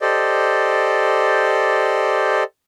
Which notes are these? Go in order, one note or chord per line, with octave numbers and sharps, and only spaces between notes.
G4 A4 C5 D5 D#5